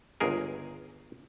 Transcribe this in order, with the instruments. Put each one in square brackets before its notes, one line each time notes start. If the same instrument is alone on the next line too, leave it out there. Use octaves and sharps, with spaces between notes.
[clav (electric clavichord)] G1 C#2 G#4 A#4